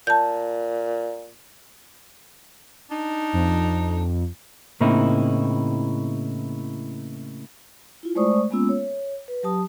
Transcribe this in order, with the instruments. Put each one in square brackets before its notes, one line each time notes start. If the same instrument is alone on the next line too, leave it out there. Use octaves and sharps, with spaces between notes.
[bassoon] A#2 [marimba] A5 G6
[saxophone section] D4 D#4
[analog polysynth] F2
[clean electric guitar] A2 C#3 A#3 C4 D#4 E4
[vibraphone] E4 F4
G#3 A3 C5 D5 C#6 D#6
G#3 A#3 B3 C#4 F4 E6
C#5
B4
F#3 G4 A5 D#6